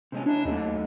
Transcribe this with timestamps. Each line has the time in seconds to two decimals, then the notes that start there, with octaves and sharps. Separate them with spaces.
0.12 C3 G#3 C#4
0.26 C#4 D4 E4
0.45 D#2 F#3 A3 D#4